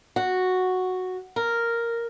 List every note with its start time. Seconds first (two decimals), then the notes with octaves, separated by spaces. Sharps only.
0.16 F#4
1.36 A#4